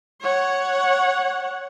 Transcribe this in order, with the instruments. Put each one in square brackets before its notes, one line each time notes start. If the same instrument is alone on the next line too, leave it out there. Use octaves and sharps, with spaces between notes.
[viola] C#5 F#5